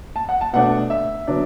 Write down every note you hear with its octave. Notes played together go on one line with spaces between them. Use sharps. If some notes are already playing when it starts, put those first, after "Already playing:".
A5
F#5
A5
B2 A3 D4 F#5
E5
D3 F#3 B3 D4